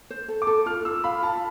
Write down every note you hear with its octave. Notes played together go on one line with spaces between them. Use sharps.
C5
A4
D6
A4
F4 F6
F4 E6
F5 B5
F4 A5